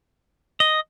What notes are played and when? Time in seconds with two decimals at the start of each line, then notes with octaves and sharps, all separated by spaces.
0.60 D#5